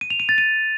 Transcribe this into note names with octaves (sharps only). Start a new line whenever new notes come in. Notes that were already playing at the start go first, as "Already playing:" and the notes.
D#7
F7
D#7
A6
D#7